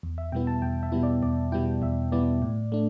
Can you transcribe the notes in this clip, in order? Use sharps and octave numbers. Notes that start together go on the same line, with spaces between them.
E2
E5
B2 G3 B3 E4 G5
A5
E2 G5
E5
B2 G3 B3 E4
D5
E2 D5
B2 G3 B3 E4 G5
E2 E5
B2 G3 B3 E4 D5
A2
A3 D4